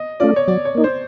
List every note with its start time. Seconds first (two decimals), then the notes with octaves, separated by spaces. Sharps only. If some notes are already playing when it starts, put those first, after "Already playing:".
Already playing: D#5
0.20 A3 C#4 F4 D5
0.36 C#5
0.48 F#3 D5
0.65 C#5
0.75 A#3 D#4
0.84 C5